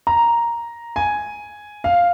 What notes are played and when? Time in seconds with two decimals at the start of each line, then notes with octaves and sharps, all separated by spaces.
0.07 A#5
0.96 G#5
1.84 F5